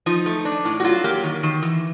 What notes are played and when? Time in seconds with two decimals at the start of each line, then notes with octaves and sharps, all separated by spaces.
0.06 F3 D#4
0.26 A3
0.45 D4
0.65 A2
0.80 F#4
0.84 F#3 F4
1.04 A#3 G4
1.24 D#3
1.43 D#3
1.62 E3